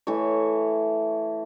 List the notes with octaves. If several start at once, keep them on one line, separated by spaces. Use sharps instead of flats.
E3 A3 C#5